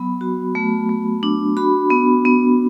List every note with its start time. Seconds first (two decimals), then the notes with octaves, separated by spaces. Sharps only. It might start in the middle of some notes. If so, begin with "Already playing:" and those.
Already playing: F#3 B3 B5
0.21 F#4
0.55 A3
0.89 A3
1.23 D4
1.57 F#4 B5
1.90 B3
2.25 B3